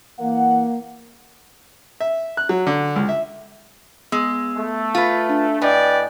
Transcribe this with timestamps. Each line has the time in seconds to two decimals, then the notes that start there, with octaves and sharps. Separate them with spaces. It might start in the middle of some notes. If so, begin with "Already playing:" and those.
0.19 E3 A#3 F#5
2.00 E5
2.37 F#6
2.49 F#3
2.67 D3
2.96 C#2
3.09 E5
4.12 G#3 B3 E6
4.57 A3
4.95 F4 B4
5.29 D4
5.62 A2 B4 D5 D#5 G5 G#5